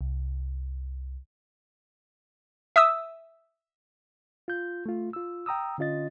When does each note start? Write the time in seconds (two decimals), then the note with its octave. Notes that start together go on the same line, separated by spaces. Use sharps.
0.01 C2
2.76 E5 D#6 E6
4.48 F4 G6
4.86 A3 F4
5.13 F4 E6
5.46 G5 A#5 D#6 E6
5.78 D3 C#4 F4 D#5 A6